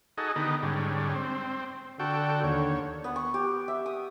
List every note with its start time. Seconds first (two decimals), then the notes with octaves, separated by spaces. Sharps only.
0.18 D#4 F#4 G#4 A4 D#5
0.36 D3 D#3 B3 D#4 G4
0.62 G#2 D3 G3 C#4
1.15 C4
2.00 D3 F#4 A4 G5
2.44 D#2 C#5
3.04 B3
3.16 C#6
3.34 G4
3.68 E5
3.86 D#6